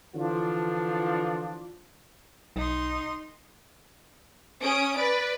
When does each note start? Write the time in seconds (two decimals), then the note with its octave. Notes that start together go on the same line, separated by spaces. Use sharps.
0.15 D3 E3 F3 D4 F4
2.56 B1 D#4 C6
4.61 C#4 D#6 D7
4.97 B4 D5